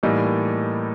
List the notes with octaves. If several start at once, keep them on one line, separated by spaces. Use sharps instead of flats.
A2 E3 G3 A#3 D#4